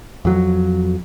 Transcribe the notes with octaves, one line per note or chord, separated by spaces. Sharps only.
F2 F#3